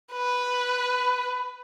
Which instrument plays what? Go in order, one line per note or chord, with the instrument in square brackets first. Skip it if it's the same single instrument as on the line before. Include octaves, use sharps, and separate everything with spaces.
[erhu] B4